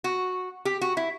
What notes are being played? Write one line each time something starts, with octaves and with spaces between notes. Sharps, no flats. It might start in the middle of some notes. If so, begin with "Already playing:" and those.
F#4
G4
F#4
E4